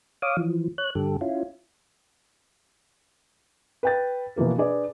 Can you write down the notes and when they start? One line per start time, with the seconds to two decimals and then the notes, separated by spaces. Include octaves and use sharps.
0.22 C#5 F5 D6 D#6
0.37 E3 F3
0.78 C#5 F#6
0.95 G2 D3 G4 A4
1.21 C#4 E4 F4
3.83 B4 G5 A6
4.36 B2 E3 F3 A#3 A#4
4.58 D4 G#4 B4 D5